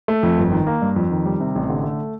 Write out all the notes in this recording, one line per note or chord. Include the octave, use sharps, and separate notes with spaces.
A3
F2
G1
D#3
A#3
G2
F2
D#3
G3
C3
A1
D3
A3